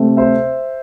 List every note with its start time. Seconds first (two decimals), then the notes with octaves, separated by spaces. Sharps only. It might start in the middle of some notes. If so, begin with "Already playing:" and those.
Already playing: C3 A3 C4
0.17 C5 E5